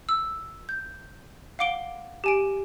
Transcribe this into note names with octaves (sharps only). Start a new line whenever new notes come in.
E6
G6
F5 F#5 D6 D7 G7
G4 G#5 D7